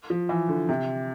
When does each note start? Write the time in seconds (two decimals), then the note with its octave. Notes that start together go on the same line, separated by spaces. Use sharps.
0.10 F3
0.29 E3
0.49 D3
0.69 C3